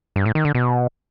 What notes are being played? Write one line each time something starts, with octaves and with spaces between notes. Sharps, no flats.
G2
A2
D#3
D3
B2